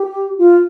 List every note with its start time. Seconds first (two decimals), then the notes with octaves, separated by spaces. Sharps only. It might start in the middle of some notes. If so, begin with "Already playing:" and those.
Already playing: G4
0.38 F4